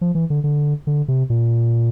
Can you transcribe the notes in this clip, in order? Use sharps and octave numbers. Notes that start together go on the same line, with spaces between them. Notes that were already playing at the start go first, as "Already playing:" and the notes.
F3
E3
D3
D3
D3
C3
A#2